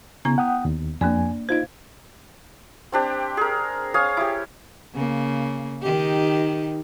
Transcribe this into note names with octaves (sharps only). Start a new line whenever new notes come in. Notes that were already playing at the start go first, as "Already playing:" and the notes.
C#3 B3 E4 A#5
F#5 G5 D#6
D#2
F2 A#3 D4 D5 G#5
D#4 F4 C5 F5 G#6
C4 D4 G4
G#4 A#4
C#5 F5 G#5 D#6
E4 G4
C#3 A#3
D#3 D#4 G4